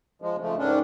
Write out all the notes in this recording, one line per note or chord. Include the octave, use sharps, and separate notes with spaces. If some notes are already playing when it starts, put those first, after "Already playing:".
F3 G#3
C#3 F3 A3
G#2 D#3 C#4 D4